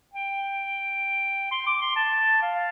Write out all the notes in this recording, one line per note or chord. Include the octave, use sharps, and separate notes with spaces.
G5
C6
D6
C6
A5
F5